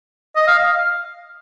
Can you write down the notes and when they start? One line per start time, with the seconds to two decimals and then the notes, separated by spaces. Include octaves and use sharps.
0.36 D#5
0.48 F5
0.59 F5